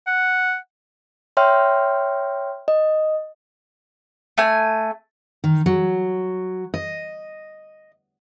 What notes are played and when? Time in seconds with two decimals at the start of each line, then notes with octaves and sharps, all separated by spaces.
0.07 F#5
1.37 C#5 E5 G5 C6 F6
2.68 D#5
4.38 A3 G#5
5.44 D#3
5.66 F#3
6.74 D#5